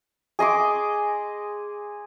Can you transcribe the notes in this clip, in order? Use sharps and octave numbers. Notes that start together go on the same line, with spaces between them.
G#4 D#5 C6 D6